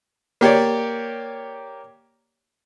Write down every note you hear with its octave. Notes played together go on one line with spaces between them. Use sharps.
A#3 G4 C#5 D5